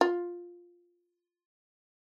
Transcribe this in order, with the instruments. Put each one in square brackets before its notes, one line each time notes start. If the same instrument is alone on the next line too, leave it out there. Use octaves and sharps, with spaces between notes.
[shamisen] F4